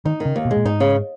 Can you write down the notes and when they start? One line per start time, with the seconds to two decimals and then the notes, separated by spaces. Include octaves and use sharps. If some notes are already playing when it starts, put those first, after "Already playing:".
0.05 D#3 D#4
0.20 D#3
0.25 C#3
0.36 D#2
0.45 B2
0.51 G#3
0.56 A#2
0.65 G#2 D#4
0.80 C#3